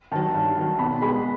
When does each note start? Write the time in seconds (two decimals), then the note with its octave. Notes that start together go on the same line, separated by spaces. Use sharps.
0.12 D#3 F#3 A5
0.34 G2
0.57 D#3 F#3
0.79 B2 B5
1.02 G#3 B3 B5